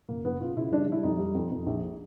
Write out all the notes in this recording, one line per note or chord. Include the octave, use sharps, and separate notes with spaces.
F#1 A#3
F#1 B3
C#3 F4
C#3 E4
G3 D4
G3 E4
F2 D#4
G3
F2
F2
A#1